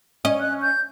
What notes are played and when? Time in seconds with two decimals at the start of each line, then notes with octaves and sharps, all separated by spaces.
0.25 C#4 D#5
0.40 F#6
0.62 G6